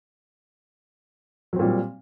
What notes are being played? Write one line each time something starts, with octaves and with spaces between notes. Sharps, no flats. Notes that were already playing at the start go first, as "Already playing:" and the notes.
A#2 F#3 G3 C4